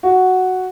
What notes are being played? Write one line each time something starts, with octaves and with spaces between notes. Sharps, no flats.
F#4